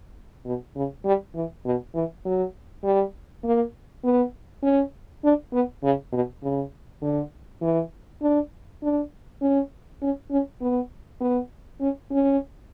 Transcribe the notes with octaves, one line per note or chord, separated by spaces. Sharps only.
B2
C#3
G3
E3
B2
E3
F#3
G3
A#3
B3
C#4
D4
B3
C#3
B2
C#3
D3
E3
D4
D4
C#4
C#4
C#4
B3
B3
C#4
C#4